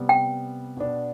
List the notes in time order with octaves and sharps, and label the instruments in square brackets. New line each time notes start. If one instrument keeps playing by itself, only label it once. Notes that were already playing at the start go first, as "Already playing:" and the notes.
Already playing: [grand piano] C3 G3 B3
[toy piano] G5
[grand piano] B2 B3 D4